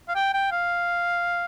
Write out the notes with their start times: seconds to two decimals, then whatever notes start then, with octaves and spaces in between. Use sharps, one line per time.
0.09 F5
0.15 G5
0.34 G5
0.52 F5